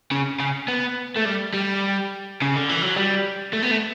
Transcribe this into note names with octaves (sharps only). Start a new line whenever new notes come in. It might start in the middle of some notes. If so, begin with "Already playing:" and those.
C#3
C#3
B3
A3
G3
G3
C#3
D3
E3
F#3
G3
A3
B3
A3